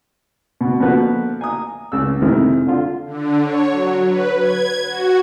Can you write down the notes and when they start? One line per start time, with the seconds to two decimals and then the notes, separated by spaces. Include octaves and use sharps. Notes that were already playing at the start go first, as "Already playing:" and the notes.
0.61 B2
0.80 B2 D3 F3 A#3 F#4 B4
1.41 G#5 A#5 D#6
1.92 C#2 E6
2.22 F2 C3 D#3 G#3 C4 E4
2.67 D3 F4
3.06 D3
3.41 C#5
3.71 F#3
4.07 B4
4.39 G#6
4.87 F#4